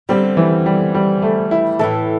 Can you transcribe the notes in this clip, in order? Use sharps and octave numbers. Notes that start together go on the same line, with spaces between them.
D3 G3 C4 G4
E3
G3
G3
A3
E4
A2 E3 A3 A4